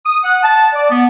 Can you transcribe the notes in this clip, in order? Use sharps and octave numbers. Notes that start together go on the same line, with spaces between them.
D#6
F#5
A5
D5
B3